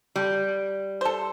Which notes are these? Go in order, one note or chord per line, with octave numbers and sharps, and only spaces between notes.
G3
A4 C5